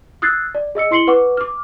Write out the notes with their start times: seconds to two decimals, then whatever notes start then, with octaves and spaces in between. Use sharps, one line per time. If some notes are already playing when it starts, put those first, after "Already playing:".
0.22 D#6 E6 F#6 G#6 A6 C7
0.55 D5
0.75 G#4 D#5 E6 C#7
0.91 E4 C6 C7 C#7 F#7 G7
1.07 B4 F#5 C#6 D6
1.37 D6 F6